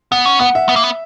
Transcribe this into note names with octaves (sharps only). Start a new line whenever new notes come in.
B3 F#5
C#4
B3 F#5
E5
B3
A#3
B3